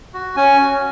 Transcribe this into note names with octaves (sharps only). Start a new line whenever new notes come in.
F#4
C#4 G#5
F#4